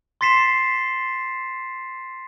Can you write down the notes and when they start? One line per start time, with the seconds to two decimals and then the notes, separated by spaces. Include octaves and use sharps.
0.21 C6 A6 B6 C7 E7